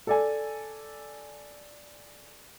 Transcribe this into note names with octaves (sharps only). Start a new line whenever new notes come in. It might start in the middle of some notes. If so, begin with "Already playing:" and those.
A4 D5 G#5